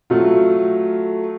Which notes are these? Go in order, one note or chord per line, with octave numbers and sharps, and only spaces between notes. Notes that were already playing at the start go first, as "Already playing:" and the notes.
F#3 A3 F4